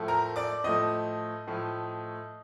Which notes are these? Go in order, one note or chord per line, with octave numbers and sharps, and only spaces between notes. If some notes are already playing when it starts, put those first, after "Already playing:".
Already playing: A2 F3 A3
A#4 A#5
D5 D6
A2 F3 A3 D#5 D#6
A2 F3 A3